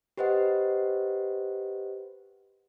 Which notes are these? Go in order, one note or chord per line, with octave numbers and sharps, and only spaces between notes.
G4 B4 C5 D#5 F#5